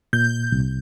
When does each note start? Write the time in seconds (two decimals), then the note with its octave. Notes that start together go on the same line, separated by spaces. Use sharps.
0.13 A#2 G6
0.52 C2